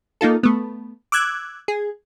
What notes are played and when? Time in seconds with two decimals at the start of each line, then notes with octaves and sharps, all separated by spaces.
0.21 A#3 D#4 F4 A4
0.43 A3 B3
1.12 D6 E6 F#6 G#6
1.68 G#4